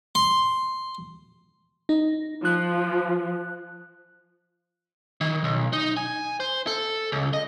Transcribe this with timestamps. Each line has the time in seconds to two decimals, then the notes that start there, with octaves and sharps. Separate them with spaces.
0.15 C6
1.89 D#4
2.45 F3 F#6
5.21 D#3
5.44 B1
5.73 D#4
5.97 G#5
6.40 C5
6.67 A4
7.12 C#2
7.33 D#5